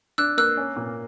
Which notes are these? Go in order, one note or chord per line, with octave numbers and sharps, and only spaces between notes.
D4 E6 F#6
A#3 E6 F#6
C#4
A#2